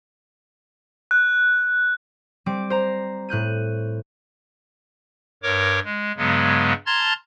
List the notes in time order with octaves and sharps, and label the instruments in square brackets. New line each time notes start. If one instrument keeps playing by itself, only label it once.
[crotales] F#6
[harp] G3 C4 D6
C5 A#5
A2 F#6 G6 D#7
[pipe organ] G2 A#4 C#5 D6
G#3
G2 C#3 F#3 G#3 B3
A5 A#5 C6 F6 G#6 A6